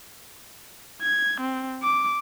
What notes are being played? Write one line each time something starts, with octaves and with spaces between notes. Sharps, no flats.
G#6
C4
D6